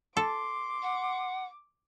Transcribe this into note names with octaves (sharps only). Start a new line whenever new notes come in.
A4 C6 D6
F#5